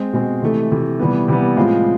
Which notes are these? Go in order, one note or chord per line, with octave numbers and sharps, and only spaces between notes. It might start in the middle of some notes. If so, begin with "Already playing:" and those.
Already playing: G#3 C4
B2 G#3 C4
C3 E3 A3
C3 E3 A3
C3 E3 G3 B3
C3 E3 G3 B3
A2 F3 G#3 C4 F4